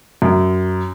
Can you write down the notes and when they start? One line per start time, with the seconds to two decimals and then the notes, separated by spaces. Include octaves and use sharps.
0.22 F#2